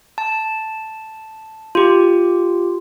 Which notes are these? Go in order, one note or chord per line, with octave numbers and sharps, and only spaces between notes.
A5
F4 G4